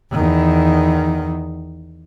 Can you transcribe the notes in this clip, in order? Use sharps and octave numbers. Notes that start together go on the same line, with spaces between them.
E2 D#3